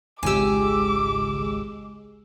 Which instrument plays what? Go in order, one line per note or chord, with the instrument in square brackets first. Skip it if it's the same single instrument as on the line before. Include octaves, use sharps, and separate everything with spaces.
[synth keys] G#1 C#2 E6 [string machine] G#3 [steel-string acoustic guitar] G4 G#5 [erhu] D6